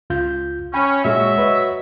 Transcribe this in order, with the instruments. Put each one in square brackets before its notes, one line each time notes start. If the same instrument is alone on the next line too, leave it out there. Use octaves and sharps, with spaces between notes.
[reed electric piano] C#2 F4 G6
[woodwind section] C#4 [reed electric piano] G5 B5
[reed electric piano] A#2 G#3 [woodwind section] F#3 F#4 E5
[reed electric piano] B4 D#5